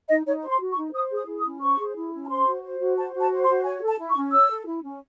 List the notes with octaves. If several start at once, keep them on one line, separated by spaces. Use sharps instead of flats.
D#4 D#5
D#4 C#5
C5
C6
F#4
C#6
D#4
C5 D#6
G#4 D#6
E4
D#6
C#4
C5 C#6
G#4
E4
C#4
A5
C5 C6
F#4
C5
F#4
C5 A5
F#4
A5
C5
C6
F#4
C#5 G#5
A4
A5
E4
C#6
C#4
C#5 E6
A4
E4
C#4